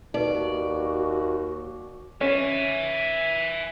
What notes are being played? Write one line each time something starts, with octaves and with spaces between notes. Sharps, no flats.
D#2 D#4 F#4 B4 D5
C#4 E5 G#5